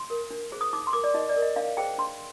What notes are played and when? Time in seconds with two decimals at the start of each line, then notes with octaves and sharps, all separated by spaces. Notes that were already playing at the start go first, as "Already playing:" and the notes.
Already playing: C6
0.10 A#4
0.30 D4
0.52 G#4 C5
0.61 D#6
0.73 D#4 D6
0.87 C6
0.93 A#4 D6
1.04 D5
1.14 D#4 D#5
1.29 D5
1.36 A#4
1.42 D#5
1.56 D4 F5
1.77 G#4 C5 G5
1.98 D4 C6